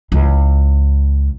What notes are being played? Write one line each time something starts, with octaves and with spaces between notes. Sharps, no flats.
C#2 E3